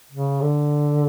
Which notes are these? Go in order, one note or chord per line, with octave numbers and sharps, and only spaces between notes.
C#3
D3